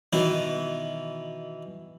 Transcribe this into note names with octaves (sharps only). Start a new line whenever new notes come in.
B2 D#3 E3 E4